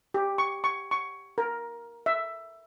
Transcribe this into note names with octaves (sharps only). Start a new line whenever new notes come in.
G4
C#6
C#6
C#6
A#4
E5